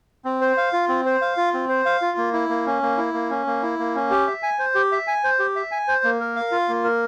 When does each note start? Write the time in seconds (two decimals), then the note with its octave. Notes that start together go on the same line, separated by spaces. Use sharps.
0.25 C4
0.41 C5
0.57 F5
0.73 F4
0.89 C4
1.06 C5
1.22 F5
1.37 F4
1.54 C4
1.69 C5
1.86 F5
2.02 F4
2.18 A#3
2.33 E4
2.49 A#3
2.67 C#4
2.83 A#3
2.97 E4
3.14 A#3
3.30 C#4
3.47 A#3
3.63 E4
3.79 A#3
3.95 C#4
4.11 G4
4.27 E5
4.43 G#5
4.59 C5
4.75 G4
4.92 E5
5.07 G#5
5.24 C5
5.39 G4
5.56 E5
5.71 G#5
5.88 C5
6.04 A#3
6.20 A#4
6.36 F5
6.52 F4
6.69 A#3
6.84 A#4